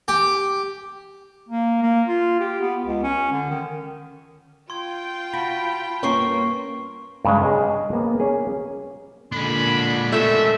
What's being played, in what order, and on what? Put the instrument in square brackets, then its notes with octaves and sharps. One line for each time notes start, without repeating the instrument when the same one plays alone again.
[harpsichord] G4
[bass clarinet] A#3
A#3
F4
G4
B3
C#2
C#4
D3
D#3
[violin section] F4 G5 [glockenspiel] C6 G#6
[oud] F#4 [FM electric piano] A5 B5
[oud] G2 A#3 B4 [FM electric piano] C#4 [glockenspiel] C6 C#6 C7
[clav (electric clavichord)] G2 C#3 G#3
G#4 C#5 D#5
A#3 B3
C#4 G#4
[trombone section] A#2 D3 [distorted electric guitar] G#3 D4 [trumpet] B5
[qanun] A3 A4 [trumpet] E5